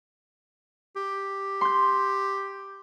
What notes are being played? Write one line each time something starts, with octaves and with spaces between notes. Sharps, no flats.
G4
C6 G6